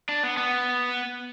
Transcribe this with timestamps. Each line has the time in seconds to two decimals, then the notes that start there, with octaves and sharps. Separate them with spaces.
0.09 D4
0.23 B3
0.37 B3